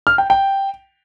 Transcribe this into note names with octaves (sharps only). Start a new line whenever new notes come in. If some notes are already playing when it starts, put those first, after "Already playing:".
F6
G5
G5